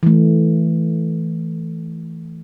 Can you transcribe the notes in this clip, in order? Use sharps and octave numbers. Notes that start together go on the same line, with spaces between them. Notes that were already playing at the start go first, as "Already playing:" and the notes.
E3 A3